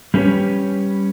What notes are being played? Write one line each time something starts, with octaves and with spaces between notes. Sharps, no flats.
G3 A3 C#4 G4 B4 C#5